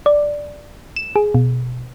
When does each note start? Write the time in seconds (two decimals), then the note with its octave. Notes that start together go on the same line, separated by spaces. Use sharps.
0.06 D5
0.96 E7
1.16 G#4
1.35 B2